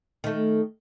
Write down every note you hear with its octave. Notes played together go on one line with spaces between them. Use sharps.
D#3 A3